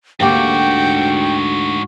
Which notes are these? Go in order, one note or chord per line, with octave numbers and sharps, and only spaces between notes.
D2 G#2 A#3 F#4 G4 G5